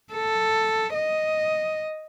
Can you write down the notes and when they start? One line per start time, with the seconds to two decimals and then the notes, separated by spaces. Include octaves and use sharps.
0.13 A4
0.94 D#5